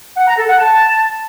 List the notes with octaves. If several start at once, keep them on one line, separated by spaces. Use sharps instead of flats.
F#5
A#5
A4
F#5
A5